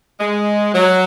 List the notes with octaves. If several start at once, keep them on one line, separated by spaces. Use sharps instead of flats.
G#3
F#3